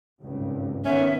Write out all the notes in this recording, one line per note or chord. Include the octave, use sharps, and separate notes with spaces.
G#1 C#2 G2
D#3 B3 C#4 E5